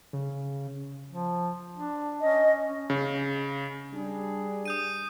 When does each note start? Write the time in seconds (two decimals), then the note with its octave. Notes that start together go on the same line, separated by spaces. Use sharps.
0.13 C#3
1.10 F3
1.76 D4
2.21 C#4 D#5
2.90 C#3
3.92 G3 D4 G#4
4.65 D#6 G6 D#7